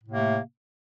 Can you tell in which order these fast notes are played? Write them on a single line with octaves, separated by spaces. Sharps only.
A2 C3 A#3 A3